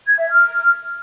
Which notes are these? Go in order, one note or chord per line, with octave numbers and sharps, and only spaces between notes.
G#6
E5
F6